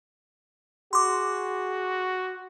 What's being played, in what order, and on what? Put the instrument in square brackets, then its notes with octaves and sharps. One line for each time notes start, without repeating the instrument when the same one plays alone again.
[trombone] F#4 [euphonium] G#4 [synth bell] C6 D6